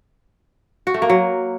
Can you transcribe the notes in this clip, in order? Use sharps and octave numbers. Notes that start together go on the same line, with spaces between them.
F#4
A3
A#3
F#3